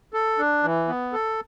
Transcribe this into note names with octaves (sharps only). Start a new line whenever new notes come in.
A4
D4
E3
B3
A4